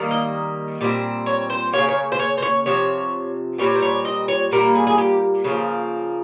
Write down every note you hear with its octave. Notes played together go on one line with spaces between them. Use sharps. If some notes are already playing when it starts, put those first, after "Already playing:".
Already playing: D#3 G3 A#3
D#5
A#2 G3 C4
C#5
C5
C#3 F3 A#3 C#5
C#5
C5
C#5
C5
C#5
C3 F3 C4 C#5
A#2 G3 C4 C#5
C5
C#5
D#5
C#5
A#2 G3 A#3 A#4
G#4
G#4
G4
C#3 F3 A#3